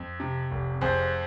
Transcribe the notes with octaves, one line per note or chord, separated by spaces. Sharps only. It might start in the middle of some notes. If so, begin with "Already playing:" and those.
Already playing: F2
C3
F1
F2 G#4 C5